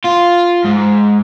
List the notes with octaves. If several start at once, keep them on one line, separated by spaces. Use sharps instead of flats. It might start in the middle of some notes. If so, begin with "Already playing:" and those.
F4
G#2